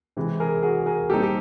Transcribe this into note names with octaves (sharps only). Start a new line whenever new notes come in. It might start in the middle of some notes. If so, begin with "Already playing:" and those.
C3 E3 G#3
G#4 A#4
F#4 G#4
G#4 A#4
A#2 G3 C4 D#4 G4 A4
G4